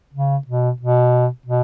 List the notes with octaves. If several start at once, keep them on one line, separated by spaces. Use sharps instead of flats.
C#3
B2
B2
B2